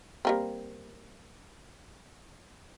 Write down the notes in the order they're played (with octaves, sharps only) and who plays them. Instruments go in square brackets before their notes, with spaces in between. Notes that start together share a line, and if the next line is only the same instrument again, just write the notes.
[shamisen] G3 A#3 C4